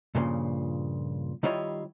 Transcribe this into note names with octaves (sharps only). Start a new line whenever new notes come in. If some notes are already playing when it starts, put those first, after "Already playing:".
G2 A#2 C#3 F3
D#3 G3 E4 F4 C#5 D#5